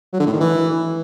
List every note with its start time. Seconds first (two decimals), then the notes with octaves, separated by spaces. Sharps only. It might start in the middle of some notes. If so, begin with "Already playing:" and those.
0.13 F#3
0.19 D3
0.26 A2
0.33 D#3
0.40 E3